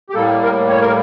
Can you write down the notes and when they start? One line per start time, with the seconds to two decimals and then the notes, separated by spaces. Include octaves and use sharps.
0.10 G4
0.15 A2 G3 A#3 A4
0.43 A#4
0.69 C#5
0.81 A#4